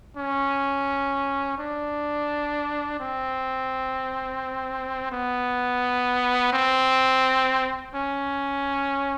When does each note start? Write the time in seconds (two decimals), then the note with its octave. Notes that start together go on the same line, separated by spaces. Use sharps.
0.17 C#4
1.58 D4
3.00 C4
5.12 B3
6.53 C4
7.95 C#4